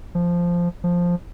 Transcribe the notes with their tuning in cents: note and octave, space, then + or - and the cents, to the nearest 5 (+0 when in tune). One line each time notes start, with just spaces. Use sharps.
F3 -5
F3 +5